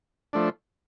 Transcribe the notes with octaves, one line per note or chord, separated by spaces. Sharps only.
F3 A3 D4